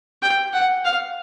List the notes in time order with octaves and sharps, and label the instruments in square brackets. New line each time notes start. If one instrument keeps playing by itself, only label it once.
[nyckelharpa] G5
F#5
F5